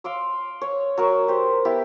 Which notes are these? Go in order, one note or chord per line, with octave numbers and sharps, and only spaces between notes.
F5 C6 D6 E6
C#5
F#3 A#4 C#6
G4 C5
B3 E4 G4